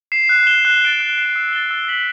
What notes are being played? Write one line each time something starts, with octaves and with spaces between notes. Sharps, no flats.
C7 E7
F#6
C7 E7 G7
F#6
A6 D7 G7
F#6
C7 E7
E6
A6 E7 G7
E6
B6 F#7